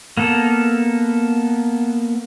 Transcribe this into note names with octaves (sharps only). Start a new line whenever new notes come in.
A#3 B3 A4